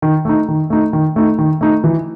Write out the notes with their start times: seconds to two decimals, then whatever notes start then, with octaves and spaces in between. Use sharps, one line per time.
0.02 D#3
0.25 A3 D#4
0.48 D#3
0.70 A3 D#4
0.93 D#3
1.16 A3 D#4
1.38 D#3
1.61 A3 D#4
1.84 E3